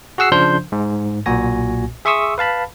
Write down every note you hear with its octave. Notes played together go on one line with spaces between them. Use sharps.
F#4 G#4 F#5 E6 C7
C#3 F3 D4 C5 C6 G6
G#2
B1 A#2 F#4 G#5 A#6
G#4 E5 C6 C#6 D#6 E6
B4 F5 A5 B5